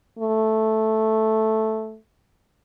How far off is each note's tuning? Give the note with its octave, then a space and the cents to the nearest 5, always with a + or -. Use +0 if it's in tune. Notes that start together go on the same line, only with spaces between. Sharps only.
A3 -5